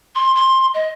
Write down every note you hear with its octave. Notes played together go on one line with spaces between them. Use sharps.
C6
C6
D#5